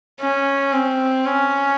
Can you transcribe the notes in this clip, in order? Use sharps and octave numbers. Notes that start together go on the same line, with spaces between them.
C#4
C4
C#4